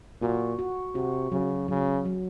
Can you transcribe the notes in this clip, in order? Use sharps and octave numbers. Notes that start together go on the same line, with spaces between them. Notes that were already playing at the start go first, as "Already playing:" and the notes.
A#2 F#4
F#4
C3 F#4
C#3 F#3
C#3 F#3
F#3